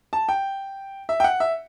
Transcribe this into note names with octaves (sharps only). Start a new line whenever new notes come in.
A5
G5
E5
G5
F#5
E5